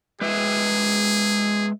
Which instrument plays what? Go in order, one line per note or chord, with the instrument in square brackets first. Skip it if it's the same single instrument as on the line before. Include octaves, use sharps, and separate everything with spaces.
[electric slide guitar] G#3 B4 E5 [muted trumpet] G#4